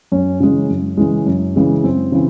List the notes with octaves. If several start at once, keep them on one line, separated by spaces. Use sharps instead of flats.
F#2 C#4
C#3 E3 G#3 C#4
F#2
C#3 E3 G#3
F#2
C#3 E3 G#3
F#2 C4
C#3 E3